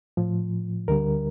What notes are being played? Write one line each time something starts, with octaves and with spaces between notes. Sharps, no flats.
A2 F3
D2 D3 G3 A#4